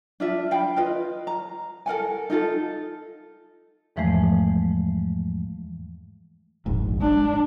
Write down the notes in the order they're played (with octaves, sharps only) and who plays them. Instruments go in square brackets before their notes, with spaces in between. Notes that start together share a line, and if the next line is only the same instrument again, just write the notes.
[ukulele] D4 F4 E5
F5 G5 B5
F4 B4 D#5
A#5
A4 A#4 F#5 G#5
D#4 F4 A4
[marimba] E2 G#2 E3 F3 G#3 A3
[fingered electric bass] F1 A#1 G#2
[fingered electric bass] G#3 [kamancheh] D4